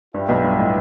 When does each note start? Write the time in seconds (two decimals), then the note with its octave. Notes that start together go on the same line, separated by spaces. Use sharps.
0.14 G2 G3 F4 B4 E5 G5
0.29 B1 B2
0.44 G2
0.59 A2